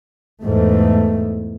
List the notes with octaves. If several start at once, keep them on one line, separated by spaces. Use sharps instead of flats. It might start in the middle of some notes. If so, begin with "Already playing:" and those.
E2 G#2 A3